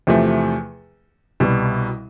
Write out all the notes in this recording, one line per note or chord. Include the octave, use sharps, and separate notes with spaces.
E2 C3 F3 A3
C2 B2 G3